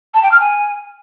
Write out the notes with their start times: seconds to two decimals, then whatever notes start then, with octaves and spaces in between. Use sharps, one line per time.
0.14 A5
0.23 G5
0.32 F6
0.40 G#5